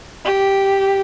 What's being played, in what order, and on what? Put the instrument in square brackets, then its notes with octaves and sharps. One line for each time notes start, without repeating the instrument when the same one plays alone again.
[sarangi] G4